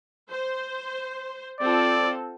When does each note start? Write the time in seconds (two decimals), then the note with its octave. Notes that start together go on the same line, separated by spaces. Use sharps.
0.30 C5
1.60 C4 F4 A4 D5